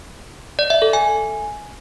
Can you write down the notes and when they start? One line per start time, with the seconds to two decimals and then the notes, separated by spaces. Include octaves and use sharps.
0.59 D5
0.70 E5
0.82 A4
0.93 G#5